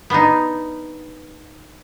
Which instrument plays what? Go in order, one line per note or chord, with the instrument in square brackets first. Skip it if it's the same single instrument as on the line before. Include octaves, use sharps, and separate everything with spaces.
[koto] B3 D4 D#4